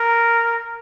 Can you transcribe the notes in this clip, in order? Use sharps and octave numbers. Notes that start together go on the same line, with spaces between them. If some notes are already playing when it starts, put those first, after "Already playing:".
Already playing: A#4